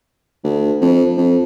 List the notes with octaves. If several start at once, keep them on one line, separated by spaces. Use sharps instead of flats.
D2
F2
F2